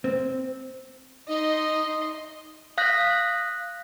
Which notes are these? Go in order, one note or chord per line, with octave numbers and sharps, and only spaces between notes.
C4
D#4 D#5 C6
F5 D#6 F#6 G6 A#6 B6